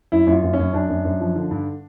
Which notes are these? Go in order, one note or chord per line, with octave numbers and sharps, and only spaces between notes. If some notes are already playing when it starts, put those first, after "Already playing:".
F#2 E4
F#2
F4
F#2
C#4
F#2
F#2 D4
F#2
F#2
F3
D3
G2